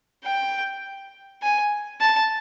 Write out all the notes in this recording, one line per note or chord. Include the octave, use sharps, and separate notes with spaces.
G5
G#5
A5